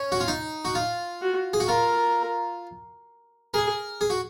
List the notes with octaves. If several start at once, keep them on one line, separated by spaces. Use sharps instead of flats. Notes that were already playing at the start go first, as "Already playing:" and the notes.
Already playing: C#4
F#4
F4
D#4
F#4
F4
F#4
G#4
F#4
F4 A#4
G#4 A#4
G#4
F#4